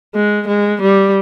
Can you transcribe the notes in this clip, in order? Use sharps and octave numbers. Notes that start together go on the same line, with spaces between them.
G#3
G#3
G3